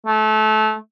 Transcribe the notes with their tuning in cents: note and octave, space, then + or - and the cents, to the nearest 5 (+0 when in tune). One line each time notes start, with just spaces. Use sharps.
A3 -25